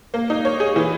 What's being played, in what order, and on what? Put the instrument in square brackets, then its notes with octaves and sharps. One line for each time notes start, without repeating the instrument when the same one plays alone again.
[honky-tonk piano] A#3
D#4
C#5
G#4
E3